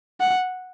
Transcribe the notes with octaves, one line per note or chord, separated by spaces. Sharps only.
F#5